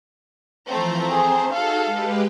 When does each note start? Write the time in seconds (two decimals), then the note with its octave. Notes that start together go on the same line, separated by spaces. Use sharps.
0.68 E3 F3 A3 C4 A#5
1.11 G#4 C5
1.53 D#4 F#4 G#4 A4 F5
1.85 G#3 G4 B4